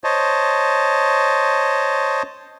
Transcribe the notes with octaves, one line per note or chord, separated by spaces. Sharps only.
C5 C#5 D#5 A5